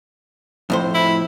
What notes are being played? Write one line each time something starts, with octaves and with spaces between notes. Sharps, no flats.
F2 A2 C5
E4